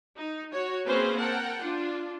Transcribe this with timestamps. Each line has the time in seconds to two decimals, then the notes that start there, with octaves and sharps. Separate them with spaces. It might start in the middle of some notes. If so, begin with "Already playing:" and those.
0.17 D#4
0.53 F#4 C#5
0.87 A#3 C4 C#4 G#4 B4 C5
1.19 A#4 F#5 G5 A5
1.61 D4 F4